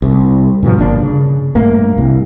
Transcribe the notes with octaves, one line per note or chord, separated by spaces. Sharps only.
C2
G2 B2 D3 F3
G1 A#3 D4
C#3
G2 A3 A#3
C2